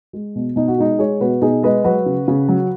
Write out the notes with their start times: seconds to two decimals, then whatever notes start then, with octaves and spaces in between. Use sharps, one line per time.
0.13 G#3
0.36 B2
0.56 B2 D#4
0.68 F#4
0.78 G#3 D#4
0.99 G#3 G#4 C#5
1.21 B2 F#4 B4
1.42 B2 D#4 G#4
1.63 G#3 B4 D#5
1.84 F#3 F#4 B4
2.06 C#3
2.28 C#3
2.49 F#3